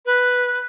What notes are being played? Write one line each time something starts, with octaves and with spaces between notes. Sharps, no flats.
B4